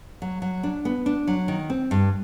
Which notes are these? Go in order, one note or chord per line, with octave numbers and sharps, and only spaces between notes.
F#3
F#3
D4
B3
D4
F#3
D#3
C4
G2